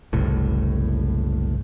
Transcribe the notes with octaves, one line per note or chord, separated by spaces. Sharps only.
F#1 C2 A2